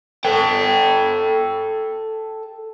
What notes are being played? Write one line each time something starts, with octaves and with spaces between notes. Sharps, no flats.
A4 G5